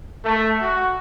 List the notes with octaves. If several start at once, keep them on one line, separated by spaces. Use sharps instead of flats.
A3
F#4